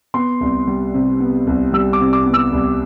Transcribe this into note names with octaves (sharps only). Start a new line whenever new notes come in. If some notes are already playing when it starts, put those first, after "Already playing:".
B3 C6
C2
G3
C3
B3
C2
G3 E6
D6
C3
D6
B3
E6
C2